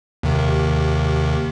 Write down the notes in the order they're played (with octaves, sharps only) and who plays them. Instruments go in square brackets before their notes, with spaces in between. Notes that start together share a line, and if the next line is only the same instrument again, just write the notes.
[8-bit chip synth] D#2 C3 D#3